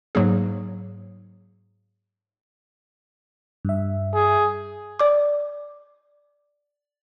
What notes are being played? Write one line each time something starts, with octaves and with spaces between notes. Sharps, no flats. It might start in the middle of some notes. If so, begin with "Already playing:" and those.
G#2 F#3 A#3 G#4
G2 E5
G#4
D5 D6